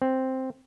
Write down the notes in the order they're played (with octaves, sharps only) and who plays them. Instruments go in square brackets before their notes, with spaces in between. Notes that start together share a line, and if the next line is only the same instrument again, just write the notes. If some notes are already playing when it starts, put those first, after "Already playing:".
[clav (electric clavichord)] C4